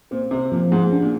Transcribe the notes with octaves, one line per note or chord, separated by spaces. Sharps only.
A#2 C4
C3 C4
A#2 F3
G#2 G#4
D4
A#2